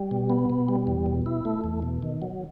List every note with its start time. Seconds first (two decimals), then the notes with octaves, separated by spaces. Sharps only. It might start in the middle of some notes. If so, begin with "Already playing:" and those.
Already playing: G3
0.11 B2
0.30 B3
0.50 B2
0.68 G3
0.87 E2
1.06 B2
1.26 E4
1.45 A3
1.64 E2
1.82 B2
2.03 D#3
2.22 F#3